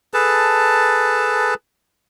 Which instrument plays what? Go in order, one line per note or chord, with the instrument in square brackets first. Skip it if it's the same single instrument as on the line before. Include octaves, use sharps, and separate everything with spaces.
[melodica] G#4 A4 B4 A5